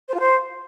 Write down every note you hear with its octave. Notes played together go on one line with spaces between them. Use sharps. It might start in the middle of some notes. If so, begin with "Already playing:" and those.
C5
F4
C5